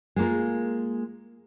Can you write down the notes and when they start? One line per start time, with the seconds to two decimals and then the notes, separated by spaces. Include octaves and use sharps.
0.16 G#3 A#3 F4